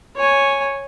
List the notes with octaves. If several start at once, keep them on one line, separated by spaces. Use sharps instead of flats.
C#5 G#5